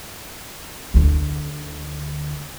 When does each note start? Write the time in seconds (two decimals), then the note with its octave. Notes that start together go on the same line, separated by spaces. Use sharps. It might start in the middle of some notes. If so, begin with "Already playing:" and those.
0.94 D2 D3